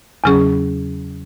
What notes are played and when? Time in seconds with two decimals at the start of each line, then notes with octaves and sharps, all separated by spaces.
0.24 E2 C#3 F#3 C#4 G#4